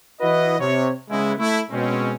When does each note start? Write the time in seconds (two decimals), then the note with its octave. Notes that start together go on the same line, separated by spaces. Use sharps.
0.20 E3 E4 F#4 B4 D#5
0.60 C3 C#5
1.10 C#3 G#3 B3 E4
1.38 A3 E4
1.71 B2 G#3 C4 C#4